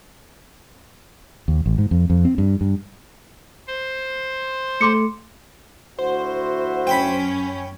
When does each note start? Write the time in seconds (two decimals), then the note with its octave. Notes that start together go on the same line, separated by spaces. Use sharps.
1.48 D#2
1.66 A1
1.78 G#2
1.91 F2
2.10 F2
2.25 C4
2.38 G2
2.61 G2
3.67 C5
4.81 A3 C6 D6 C#7
5.99 D2 E4 F#4 C5
6.87 F#2 C#4 G5 B5